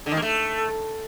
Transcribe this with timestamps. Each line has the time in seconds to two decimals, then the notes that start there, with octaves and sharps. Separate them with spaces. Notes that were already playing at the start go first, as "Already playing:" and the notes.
0.06 D3
0.12 D#3
0.17 A#3
0.22 A3